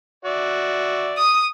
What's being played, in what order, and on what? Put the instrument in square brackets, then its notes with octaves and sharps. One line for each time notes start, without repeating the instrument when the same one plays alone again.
[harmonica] F#4 D5 E5
[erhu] D#6